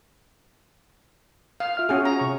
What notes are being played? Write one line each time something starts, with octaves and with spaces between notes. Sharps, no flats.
F5
F4 E5 F6
C#4 F#4 G#4
A#5
C3 C#6